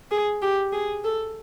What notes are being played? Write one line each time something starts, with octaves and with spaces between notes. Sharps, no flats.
G#4
G4
G#4
A4